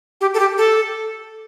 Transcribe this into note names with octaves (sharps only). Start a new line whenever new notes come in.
G4
A4
G4
A4